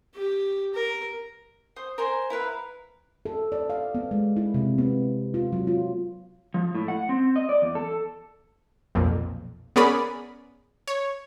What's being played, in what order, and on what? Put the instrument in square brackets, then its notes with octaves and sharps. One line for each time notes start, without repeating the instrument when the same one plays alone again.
[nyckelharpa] G4
A#4
[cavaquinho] C5 D#6
A#4 C5 G#5 C6
E4 A#4 B4 F5
[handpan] A4
D5
F5
B3
G#3
E4
C3
B3
F4
F#3
F4
[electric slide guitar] F3
A2
F#5
C4
D#5
D5
E2
A4
[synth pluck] B1 F2 A#2
B3 C#4 G#4 A#4 D5 B5
C#5